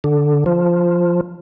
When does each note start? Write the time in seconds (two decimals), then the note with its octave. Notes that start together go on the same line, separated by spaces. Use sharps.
0.04 D3
0.46 F3